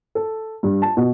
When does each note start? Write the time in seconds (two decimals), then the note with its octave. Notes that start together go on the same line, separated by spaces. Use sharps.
0.15 A4
0.63 G2
0.82 A5
0.97 B2